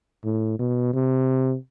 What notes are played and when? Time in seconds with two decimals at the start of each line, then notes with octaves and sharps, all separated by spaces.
0.25 A2
0.59 B2
0.94 C3